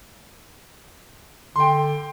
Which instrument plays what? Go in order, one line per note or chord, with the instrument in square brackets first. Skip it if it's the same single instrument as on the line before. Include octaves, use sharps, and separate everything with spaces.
[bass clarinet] D3 [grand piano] G5 C6